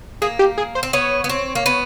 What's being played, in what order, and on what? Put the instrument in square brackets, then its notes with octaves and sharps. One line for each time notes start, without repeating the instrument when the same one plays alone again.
[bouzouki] A#3 [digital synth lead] G#4
[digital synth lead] G4
G#4
C5
[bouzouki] C4
[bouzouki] B3 [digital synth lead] C#5
[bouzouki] B3
C4
A#3
B3